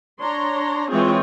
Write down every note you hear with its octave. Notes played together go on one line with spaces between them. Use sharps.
D4 C#5 A#5 C6
E3 G#3 C4 F4 G#4 C#5